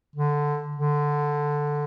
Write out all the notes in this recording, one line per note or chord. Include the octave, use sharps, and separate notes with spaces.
D3
D3